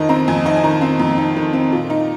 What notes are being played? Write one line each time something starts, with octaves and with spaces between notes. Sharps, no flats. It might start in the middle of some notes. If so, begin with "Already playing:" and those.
Already playing: F2 D#3 D#4 D#5
C4 A#5
F2 G#5
D#4 D#5
G#5
D#3 A#5
C4
F2
D#4
D#3
C4
A#2
D#4